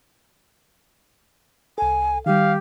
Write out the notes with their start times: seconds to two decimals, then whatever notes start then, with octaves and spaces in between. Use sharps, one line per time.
1.78 C2 A4 G#5
2.26 D#3 G3 G4 F5